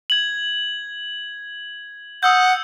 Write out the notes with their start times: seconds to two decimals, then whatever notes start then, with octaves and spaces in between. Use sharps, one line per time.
0.10 G#6 F#7
2.23 F#5 D#6 E6 G6